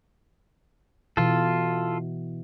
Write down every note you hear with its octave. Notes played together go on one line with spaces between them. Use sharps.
B2 E3 F4 A4